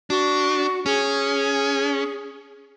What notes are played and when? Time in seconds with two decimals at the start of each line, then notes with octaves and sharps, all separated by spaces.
0.10 D4 F#4
0.86 C#4 G#4